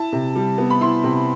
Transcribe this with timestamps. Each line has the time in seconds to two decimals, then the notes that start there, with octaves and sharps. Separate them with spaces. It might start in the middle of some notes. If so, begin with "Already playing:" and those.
Already playing: E4 A5
0.13 C3
0.36 G3
0.58 B3
0.70 B5
0.81 E4 C6
1.04 C3